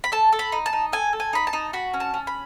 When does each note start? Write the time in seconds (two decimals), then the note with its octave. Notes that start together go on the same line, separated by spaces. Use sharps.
0.04 B5
0.12 A4 A5
0.32 A4
0.39 B5
0.52 D#4
0.66 A5
0.73 D#4
0.92 A4 G#5
1.13 A4
1.20 G#5
1.33 D#4 B5
1.47 A5
1.53 D#4
1.73 F#4 B5
1.94 C#4
2.00 A5
2.14 C#4
2.27 B5